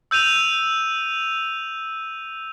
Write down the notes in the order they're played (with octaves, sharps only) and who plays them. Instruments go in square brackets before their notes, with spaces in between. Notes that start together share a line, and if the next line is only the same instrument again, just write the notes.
[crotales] E6 G6 D#7 F7